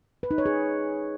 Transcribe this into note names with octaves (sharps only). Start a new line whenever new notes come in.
B4
D#4
C#5
G#4